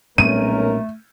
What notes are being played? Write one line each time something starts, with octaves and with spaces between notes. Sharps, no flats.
B1 A#2 G3 A3 C4 C#4 A#4 D#7